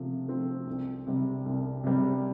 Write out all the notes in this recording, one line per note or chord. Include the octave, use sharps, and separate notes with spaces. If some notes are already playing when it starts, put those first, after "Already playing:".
Already playing: C3 F3 A3 C4
F3 A3 C4
C2
C3 G3
C2
C3 G3